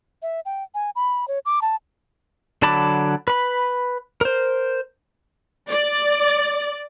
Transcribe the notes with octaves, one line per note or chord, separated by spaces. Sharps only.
E5
G5
G#5
B5
C#5
D6
A5
D3 F#3 A5 B5 D6
B4 B5
A#4 C5
D5